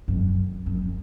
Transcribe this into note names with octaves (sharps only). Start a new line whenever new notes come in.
F#2
F#2